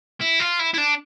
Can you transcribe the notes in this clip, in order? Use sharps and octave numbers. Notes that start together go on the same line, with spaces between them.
E4
F4
E4
E4
D4